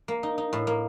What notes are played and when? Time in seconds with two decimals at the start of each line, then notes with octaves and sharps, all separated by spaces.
0.08 A#3
0.23 D#4
0.38 D#4
0.53 A2
0.67 A#3